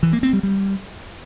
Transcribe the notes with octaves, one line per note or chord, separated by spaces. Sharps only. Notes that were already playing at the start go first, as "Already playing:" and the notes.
E3
A#3
C4
G3
G3